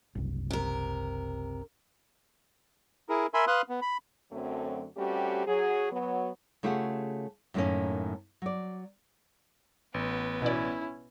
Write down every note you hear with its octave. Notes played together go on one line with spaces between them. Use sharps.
F#1 C2
C3 A#4
E4 G#4 A#4
A#4 E5 G#5 B5 C6
B4 F5 C6 D#6 F#6
B3
B5
F#2 D3 F#3 A3 C4
G3 A3 C4 C#4 F#4 G4
F#3 G#4
F#3 B3
C#3 A3 F4 G4 G#4 F#5
F#2 A2 D#3 A3 A#3 C#4
F#3 D5
A1 B3
B2 C#4 E4 D5